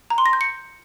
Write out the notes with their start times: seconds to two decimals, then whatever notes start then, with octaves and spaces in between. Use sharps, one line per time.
0.10 A#5
0.18 C6
0.26 A#6
0.33 G6
0.41 C#7